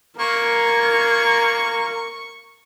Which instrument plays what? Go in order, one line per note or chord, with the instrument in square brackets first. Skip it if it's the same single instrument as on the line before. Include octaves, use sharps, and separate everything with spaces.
[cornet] A#3 [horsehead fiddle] A#4 [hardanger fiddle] C#6 [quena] G#6